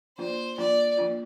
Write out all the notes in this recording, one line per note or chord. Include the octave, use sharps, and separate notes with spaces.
F3 A#3 D4 F4 C5
F3 A#3 D4 F4 D5
F3 A#3 D4 F4